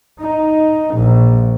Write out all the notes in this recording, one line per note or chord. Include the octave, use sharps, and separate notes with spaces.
D#4
A#1